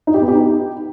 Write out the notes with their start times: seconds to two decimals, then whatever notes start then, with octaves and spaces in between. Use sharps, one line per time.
0.07 D#4
0.14 G4
0.21 B3
0.28 G4
0.35 D#4